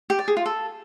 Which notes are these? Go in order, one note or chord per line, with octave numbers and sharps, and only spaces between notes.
G4
D5
G#4
F4
A4